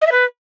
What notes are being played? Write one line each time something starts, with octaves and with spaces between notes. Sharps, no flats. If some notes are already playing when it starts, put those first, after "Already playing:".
D#5
E5
B4